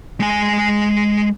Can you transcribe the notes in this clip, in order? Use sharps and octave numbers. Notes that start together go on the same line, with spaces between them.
G#3 G#5